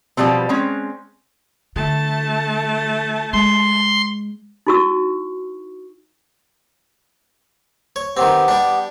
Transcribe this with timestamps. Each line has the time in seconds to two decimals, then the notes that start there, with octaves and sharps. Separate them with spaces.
0.17 B2 F3 G3 A3 C4
0.49 G#3 C4 C#4
1.76 D3 A3 A5
3.33 G#3 C6
4.67 D#4 E4 F#4 C#6 E6
7.96 C#5
8.17 D#3 B3 C4 G4
8.48 G3 D4